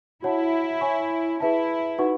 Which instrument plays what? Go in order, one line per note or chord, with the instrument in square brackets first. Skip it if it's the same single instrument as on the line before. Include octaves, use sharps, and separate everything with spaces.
[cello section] E4 [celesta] F#4 C#5 F#5 A5
[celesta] C#5 G#5 C#6
[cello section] E4 [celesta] G#4 B4 E5 A5
[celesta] D#4 F#4 B4 F#5 C#6